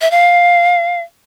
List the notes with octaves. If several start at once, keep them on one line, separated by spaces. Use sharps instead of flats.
E5
F5